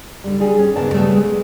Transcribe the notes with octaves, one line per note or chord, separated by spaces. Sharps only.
D3 G3
G3 G#4
C#4
D#2 C#3 A#3 B3 A5
C#3 G3 A3 B3
G#3